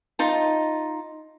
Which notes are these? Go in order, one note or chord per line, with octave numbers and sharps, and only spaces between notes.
D#4 F4 A5